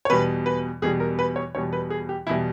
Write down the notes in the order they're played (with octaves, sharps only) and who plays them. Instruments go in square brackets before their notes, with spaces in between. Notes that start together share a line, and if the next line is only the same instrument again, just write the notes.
[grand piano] C#5
E2 B2 G3 B4
B4
E2 B2 G3 G#4
A#4
B4
C#5
E2 B2 G3 C#5
B4
G#4
G4
E2 B2 G3 E4